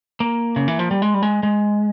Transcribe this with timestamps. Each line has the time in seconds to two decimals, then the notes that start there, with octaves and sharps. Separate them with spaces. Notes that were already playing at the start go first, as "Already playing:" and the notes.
0.20 A#3
0.56 C#3
0.68 E3
0.79 F3
0.91 G3
1.02 G#3
1.14 G3
1.23 G#3
1.43 G#3